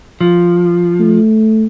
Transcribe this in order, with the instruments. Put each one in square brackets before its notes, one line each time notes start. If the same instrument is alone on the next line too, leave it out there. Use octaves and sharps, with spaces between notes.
[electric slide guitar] F3
[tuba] A3